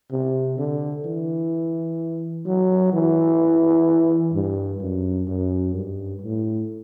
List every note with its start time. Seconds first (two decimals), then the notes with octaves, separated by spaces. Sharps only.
0.11 C3
0.58 D3
1.05 E3
2.46 F#3
2.93 E3
4.33 G2
4.80 F#2
5.28 F#2
5.74 G2
6.22 A2